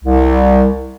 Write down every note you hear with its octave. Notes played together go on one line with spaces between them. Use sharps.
C2